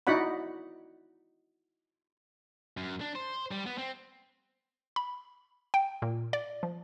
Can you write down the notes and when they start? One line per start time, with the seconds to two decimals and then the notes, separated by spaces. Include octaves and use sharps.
0.07 D#4 E4 F#4 D5 F#5 B5
2.77 F#2
3.01 D4
3.15 C5
3.51 G3
3.66 B3
3.78 C4
4.96 B5
5.74 G5
6.02 A#2
6.33 D5
6.63 F3